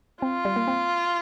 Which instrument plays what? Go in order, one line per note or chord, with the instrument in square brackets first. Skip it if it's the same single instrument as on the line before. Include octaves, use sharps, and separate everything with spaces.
[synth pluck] C4 [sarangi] F4
[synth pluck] G3
A#3
C4